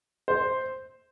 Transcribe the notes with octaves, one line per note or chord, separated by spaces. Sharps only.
C5